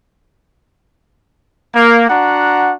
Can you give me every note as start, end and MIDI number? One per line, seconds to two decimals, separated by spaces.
1.74 2.04 58
2.08 2.73 62
2.08 2.73 66
2.08 2.73 78
2.08 2.73 82